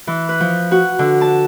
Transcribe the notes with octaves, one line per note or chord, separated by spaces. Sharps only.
E3
B4
F3
F#4
D3
A5